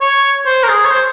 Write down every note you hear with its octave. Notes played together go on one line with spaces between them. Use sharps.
C#5
C5
A#4
G#4
C#5
C5